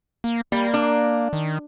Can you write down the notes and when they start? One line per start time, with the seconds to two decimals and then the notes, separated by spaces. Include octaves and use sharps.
0.24 A#3
0.52 G3 A#3
0.74 D4
1.33 D#3